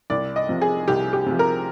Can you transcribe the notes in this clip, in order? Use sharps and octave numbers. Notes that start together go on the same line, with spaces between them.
C2 D5
D#5
C3 F3
G#4
C2 G4
G4
C3 F3
A#4